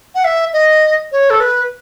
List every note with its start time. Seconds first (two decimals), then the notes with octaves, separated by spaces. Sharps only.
0.15 F#5
0.24 E5
0.53 D#5
1.12 C#5
1.30 A4
1.40 B4